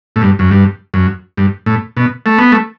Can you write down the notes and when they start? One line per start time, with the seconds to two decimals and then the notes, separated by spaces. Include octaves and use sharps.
0.16 A2
0.22 G2
0.39 F#2
0.51 G2
0.94 F#2
1.37 G2
1.66 A2
1.97 B2
2.26 A3
2.38 B3
2.52 A3